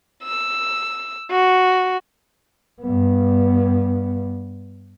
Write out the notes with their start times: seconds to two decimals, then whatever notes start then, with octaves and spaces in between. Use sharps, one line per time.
0.24 E6
1.30 F#4
2.82 G2 B3